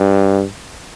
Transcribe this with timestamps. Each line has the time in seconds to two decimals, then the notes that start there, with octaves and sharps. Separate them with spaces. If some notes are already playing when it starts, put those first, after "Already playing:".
Already playing: G2